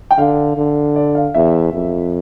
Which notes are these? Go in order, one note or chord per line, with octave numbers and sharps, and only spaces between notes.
G5
D3 F5
D3
D5
F5
E2 E5
F2